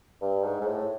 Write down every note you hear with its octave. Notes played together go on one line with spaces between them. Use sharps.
G2
G#2
G#2
A2